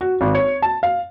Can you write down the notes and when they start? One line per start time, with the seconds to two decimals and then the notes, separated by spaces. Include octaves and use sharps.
0.01 F#4
0.21 G#1
0.35 C#5
0.62 A5
0.83 F5